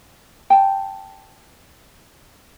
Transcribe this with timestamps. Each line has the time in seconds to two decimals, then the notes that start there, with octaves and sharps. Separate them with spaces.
0.50 G5 A5